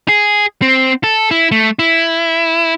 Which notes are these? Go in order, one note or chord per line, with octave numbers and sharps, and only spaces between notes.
G#4
C4
A4
E4
A3
E4